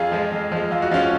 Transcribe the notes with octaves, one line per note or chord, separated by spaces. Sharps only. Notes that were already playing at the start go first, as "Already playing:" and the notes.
Already playing: F2 F4 G#4
F3 G#3
F2
F3 G#3
F2 F4
F#4
F3 G#3 C#4 F4